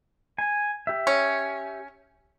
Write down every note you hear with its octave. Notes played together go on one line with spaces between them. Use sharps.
G#5
G4 E5
C#4